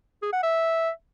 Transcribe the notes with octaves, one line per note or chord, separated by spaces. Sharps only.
G#4
F#5
E5